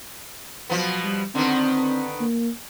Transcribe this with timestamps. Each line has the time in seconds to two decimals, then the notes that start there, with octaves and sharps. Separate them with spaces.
0.70 B2 F3 F#3 B3
1.04 G3
1.35 D3 D#3 B3 C4
2.21 A#3